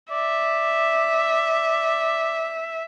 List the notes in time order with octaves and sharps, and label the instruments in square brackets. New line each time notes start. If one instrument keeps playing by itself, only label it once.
[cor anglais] D5 [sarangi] E5